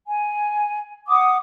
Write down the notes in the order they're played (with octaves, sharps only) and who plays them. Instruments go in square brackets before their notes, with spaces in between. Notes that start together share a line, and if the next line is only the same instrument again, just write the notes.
[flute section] G#5
F#5 D6 D#6